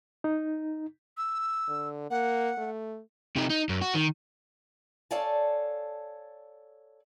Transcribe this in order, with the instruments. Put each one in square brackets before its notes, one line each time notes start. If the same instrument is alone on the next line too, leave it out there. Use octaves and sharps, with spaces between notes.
[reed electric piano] D#4
[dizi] E6
[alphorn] D3
[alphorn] A#3 [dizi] F#5
[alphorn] A3
[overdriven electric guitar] C3 D#4
D#4
F#2
F#4
D#3
[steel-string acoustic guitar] A4 C#5 D5 F5 G#5 A5